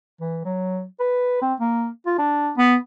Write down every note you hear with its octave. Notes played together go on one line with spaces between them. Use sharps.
E3
F#3
B4
C4
A#3
F4
D4
B3